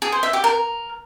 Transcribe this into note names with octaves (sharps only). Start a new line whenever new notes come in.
G#4
C5
E5
G4
A#4